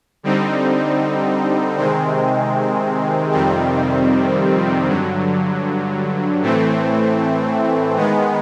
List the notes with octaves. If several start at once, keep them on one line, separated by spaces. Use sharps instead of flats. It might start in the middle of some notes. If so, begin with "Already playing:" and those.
D3 G3 C4 D#4
C3 D#3 G#3 C4
F2 C3 D#3 G3 C4
G2 D3 F#3
A2 E3 A3 C4
D#3 G#3 B3